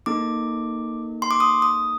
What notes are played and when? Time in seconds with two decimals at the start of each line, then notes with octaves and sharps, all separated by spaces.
0.06 A#3 D#4 A4 D6
1.22 C6
1.31 D6
1.40 D#6
1.62 D#6